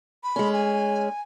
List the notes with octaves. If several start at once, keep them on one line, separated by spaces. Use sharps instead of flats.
B5
G#3 C#4
G#5